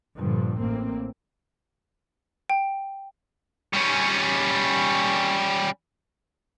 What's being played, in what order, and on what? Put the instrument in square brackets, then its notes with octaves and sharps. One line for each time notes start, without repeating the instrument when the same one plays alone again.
[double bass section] G2 A#2 D3 F3
A1 A2 A#3 C4
[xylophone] G5
[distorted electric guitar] G3 C#4